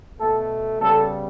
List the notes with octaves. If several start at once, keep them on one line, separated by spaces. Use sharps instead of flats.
B2 A3 A4
C#3 G3 B3 A4